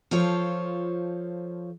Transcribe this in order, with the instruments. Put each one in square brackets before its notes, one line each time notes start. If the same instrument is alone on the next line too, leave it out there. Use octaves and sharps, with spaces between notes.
[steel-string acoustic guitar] F3 F4 A4 C5 C#5